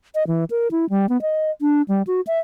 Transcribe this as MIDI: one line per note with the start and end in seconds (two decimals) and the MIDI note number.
0.15 0.24 75
0.27 0.44 52
0.50 0.68 70
0.71 0.89 64
0.90 1.09 55
1.09 1.20 59
1.22 1.51 75
1.61 1.82 62
1.88 2.02 55
2.07 2.21 66
2.27 2.39 76